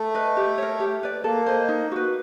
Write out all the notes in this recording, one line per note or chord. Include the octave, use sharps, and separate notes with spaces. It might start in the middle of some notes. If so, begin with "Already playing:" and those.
Already playing: A3
B4 D#5
G4
A#4 C#5
G4
B4 D5
A#3 A4
C5 D#5
D#4
F#4 B4